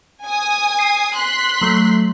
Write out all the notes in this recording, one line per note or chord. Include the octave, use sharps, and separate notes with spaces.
G#5 D#6
C7
C6 F#6 B6
F#3 A3